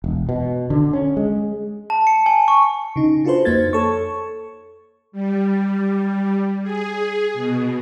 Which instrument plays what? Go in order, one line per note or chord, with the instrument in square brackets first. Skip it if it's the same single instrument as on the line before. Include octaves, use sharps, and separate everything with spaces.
[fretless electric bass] E1
B2
D3
C#4
G#3
[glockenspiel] A5
C#7
G#5
C#6
[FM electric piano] C#3 D#4
D4 F4 F#4 A4 B4 C5
F2 A#3 D#4 C5 G#6 A6
A4 C#5 C#6
[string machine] G3
G#4
B2